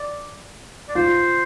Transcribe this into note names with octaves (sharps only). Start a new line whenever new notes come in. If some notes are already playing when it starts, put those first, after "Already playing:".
Already playing: D5
D5
F4 C5